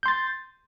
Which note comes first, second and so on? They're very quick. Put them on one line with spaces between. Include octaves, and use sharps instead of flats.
G6 C6 A6